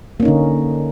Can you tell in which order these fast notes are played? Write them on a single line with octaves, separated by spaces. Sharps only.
A#3 C#4 D#4 D3